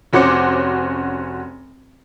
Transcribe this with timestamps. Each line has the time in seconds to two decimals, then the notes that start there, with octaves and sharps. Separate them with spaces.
0.13 F1 C#4 F#4 C5 D6 C#7